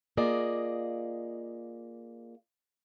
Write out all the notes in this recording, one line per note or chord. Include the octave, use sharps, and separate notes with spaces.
A#3 F4 G#4 D5 D#5